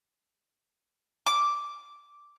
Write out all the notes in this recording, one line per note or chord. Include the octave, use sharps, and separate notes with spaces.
D6